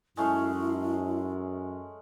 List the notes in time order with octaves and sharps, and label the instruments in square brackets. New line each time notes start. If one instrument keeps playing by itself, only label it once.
[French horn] F#2 [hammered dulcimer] G#3 A3 C#4 [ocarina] E4